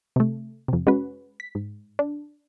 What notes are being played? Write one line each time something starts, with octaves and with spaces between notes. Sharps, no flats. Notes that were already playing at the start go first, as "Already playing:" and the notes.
C3 A3
F2 C3
G#3 C#4 F#4 B4
B6
G#2
D4